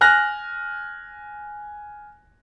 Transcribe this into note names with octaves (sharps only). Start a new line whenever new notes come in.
G#5 F6 F#6 A#6